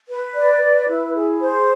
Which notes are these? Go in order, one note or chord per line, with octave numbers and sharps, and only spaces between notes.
B4
D5
B4
E4
G#4
C5